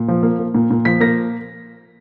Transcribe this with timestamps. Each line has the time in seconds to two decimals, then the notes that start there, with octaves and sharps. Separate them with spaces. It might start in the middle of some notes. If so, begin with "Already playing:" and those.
Already playing: A#2
0.08 F3
0.23 A#3
0.39 A#3
0.54 A#2
0.71 A#2
0.85 F3 B6
1.00 A#3 A#6